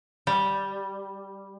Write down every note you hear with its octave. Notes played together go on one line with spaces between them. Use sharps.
G3